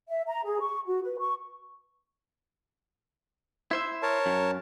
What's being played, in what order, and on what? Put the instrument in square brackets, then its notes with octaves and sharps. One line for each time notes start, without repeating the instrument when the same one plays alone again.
[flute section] E5
A#5
G#4
C#6
F#4
B4
C#6
[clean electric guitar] E4 C5 E5
[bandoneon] A#4 C#5 A5
[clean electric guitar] F#2